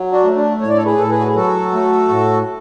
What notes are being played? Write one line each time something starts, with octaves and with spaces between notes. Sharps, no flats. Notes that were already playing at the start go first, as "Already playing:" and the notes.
Already playing: F#3
D4 F#4
A3
D4
A2 C#5
D5
A4 C#5
G#4 B4
A2 A4
G#4 B4
F#4
G#4
F#3 F#4 A4
A3
A2